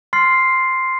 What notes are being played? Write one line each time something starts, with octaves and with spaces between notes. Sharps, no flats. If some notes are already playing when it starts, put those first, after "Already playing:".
C6 F6 A6 C7